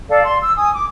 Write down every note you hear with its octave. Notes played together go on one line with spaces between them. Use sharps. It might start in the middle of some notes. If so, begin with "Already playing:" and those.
A4 D5 F5
C6
E6
G#5 D#6
D6